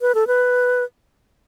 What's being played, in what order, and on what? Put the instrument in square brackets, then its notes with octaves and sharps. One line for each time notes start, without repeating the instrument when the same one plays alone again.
[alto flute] B4
A4
B4